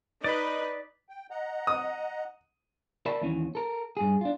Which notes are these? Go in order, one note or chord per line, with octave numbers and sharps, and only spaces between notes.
D#4 B4 D5 D#5 B5
G5
D#5 F#5 A#5
D#6
A#4 D5 E5 A5 B5
D#2 E3 C#4
A4 A#4
G2 G#4
D4 F4